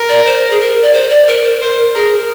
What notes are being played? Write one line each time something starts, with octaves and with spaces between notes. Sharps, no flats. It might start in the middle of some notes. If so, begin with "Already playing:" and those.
Already playing: A#4
D5
C5
G#4
A#4
D5
C5
D5
A#4
C5
A#4 C5
G#4 A#4